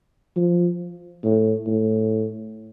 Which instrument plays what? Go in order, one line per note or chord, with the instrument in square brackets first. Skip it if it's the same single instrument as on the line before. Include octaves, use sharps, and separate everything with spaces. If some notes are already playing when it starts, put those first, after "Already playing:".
[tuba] F3
A2
A2